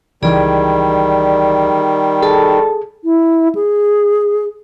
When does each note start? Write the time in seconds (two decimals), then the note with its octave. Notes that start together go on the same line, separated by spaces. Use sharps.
0.23 C#2 D#3 E3 G3 G#4 D5
2.22 G#4 A4 A5
3.04 E4
3.55 G#4